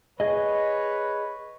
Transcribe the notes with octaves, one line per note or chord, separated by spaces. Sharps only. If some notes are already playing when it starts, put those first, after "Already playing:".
G#4 B4 C#5 D#5